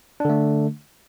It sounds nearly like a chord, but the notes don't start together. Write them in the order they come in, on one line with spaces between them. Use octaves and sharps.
D4 D3 A3